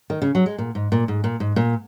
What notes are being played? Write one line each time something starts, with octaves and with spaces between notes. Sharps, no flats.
D#3
C#3
F#3
G#3
A#2
G#2
A#2
G#2
A#2
G#2
A#2